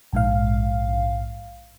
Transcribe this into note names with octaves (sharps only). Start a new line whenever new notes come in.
A#1 G#2 F5